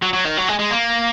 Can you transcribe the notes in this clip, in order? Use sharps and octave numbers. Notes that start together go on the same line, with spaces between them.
F#3
F#3
D#3
F#3
G#3
G#3
A#3